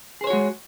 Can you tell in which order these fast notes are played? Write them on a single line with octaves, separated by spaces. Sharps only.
G#4 C5 C#5 F#4 G#3